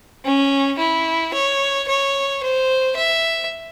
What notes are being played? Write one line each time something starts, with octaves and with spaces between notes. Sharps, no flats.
C#4
E4
C#5
C#5
C5
E5